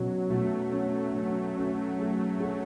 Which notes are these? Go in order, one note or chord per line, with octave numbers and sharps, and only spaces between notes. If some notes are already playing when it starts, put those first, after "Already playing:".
Already playing: B2 F#3 C#4
B2 A3
C#4
C#4
C#4
G#4
G#4